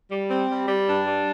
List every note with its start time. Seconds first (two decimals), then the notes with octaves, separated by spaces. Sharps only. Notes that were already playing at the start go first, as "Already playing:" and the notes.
0.11 G3
0.30 C4
0.50 G3
0.68 G3
0.88 G2 D4
1.07 G3